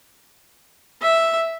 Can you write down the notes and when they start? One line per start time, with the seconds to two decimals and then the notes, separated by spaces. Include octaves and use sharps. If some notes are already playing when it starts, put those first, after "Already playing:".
1.02 E5